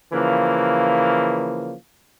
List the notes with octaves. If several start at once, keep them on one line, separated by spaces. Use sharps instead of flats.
C#3 E3 F3 A#3